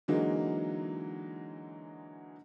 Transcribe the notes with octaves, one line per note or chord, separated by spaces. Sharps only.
D3 E3 F#3 G#3 A#3 D#4